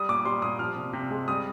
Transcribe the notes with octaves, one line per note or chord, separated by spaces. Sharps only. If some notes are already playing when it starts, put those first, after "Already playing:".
Already playing: G3 D#6
A#2 D6
G3 C6
A#2 D#6
F3 F6
C3
C3
G#3
G3 D#6